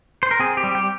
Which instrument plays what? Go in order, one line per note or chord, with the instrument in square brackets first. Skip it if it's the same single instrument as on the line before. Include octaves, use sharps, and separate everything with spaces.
[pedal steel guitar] C5
A#4
C4 G#4
G4
G3
G4